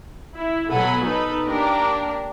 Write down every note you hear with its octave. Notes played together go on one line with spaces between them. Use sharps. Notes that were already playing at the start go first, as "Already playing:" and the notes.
E4
B2 F#3 A4 F#5 G#5 B5
D#4 A4 B4
A#3 D4 G4 A#4